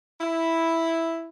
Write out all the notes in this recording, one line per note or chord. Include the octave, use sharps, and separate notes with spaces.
E4